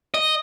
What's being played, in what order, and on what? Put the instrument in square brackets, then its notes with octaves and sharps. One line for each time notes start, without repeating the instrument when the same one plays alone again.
[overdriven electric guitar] D#5